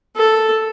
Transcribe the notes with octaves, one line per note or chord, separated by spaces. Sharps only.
A4